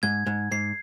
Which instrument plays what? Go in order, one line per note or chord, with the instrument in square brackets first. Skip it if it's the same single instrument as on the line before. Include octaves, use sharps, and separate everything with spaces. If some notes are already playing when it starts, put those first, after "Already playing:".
[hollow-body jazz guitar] G#2 [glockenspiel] G#6
[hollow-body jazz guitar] G#2
[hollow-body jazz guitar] G#2 [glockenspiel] C7